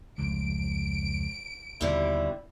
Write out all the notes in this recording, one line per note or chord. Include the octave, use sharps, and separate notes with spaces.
F1 C#2 D7
D#2 B2 D3 G3 E4